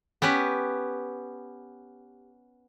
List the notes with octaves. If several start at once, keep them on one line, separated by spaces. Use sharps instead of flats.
B3 C#4 G4 B4